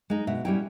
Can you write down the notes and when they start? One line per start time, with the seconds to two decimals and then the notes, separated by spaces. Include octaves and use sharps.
0.10 G#3 D#4
0.27 B2 E5
0.45 G3 C#4 E4 G5